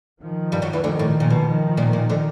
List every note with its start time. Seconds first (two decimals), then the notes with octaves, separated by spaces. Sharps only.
0.21 D#3 F3
0.52 G2 G3
0.62 F#2 F#3
0.73 E2 E3
0.83 D2 D3 D#3 F3
0.99 A2
1.20 A#2
1.30 B2
1.46 D#3 F3
1.77 A#2
1.93 A#2
2.10 D3